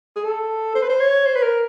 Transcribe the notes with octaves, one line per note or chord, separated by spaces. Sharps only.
G#4
A4
C5
B4
C5
C#5
C5
B4
A#4